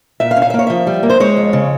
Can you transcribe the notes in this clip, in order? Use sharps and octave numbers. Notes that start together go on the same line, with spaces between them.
A#2 E5
F5
C#4
F5
E5
A#3
C#5
F3 E5
G3
A#3
C5
G#3 C#5
F2
C#3